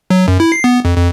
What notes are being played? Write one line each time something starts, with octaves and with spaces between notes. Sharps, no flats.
F#3
F#2
E4
C7
B3
F2
F2